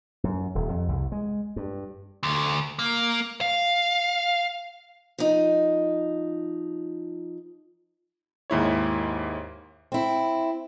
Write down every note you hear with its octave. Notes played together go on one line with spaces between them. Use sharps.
F#2
D#1
F2
C2
G#3
G2
D2
A#3
F5
F3 D#4
D#2 G#2 E4 C#5
C4 E4